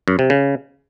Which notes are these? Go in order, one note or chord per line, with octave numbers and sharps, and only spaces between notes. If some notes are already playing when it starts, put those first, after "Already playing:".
F#2
C3
C#3